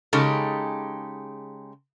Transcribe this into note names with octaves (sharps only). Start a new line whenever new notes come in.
C#3 G#3 D#4 G4 A4